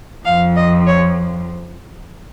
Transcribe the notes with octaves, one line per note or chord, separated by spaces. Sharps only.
F2 F3 F5
D#5
C#5